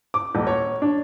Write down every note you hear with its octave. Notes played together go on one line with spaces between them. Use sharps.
D6
D#1
C#5
D4